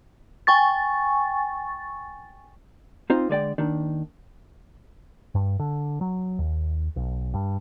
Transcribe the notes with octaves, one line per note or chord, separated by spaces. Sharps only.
G5 G#5 C#6 A6
C4 D#4 F4 C5
D3 G#3 D5 G5
D#2 D#3 D4
G2
D3
F#3
D#2
B1
G2